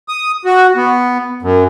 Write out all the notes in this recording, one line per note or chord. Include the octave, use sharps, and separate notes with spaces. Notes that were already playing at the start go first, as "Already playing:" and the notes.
D#6
F#4
B3
F#2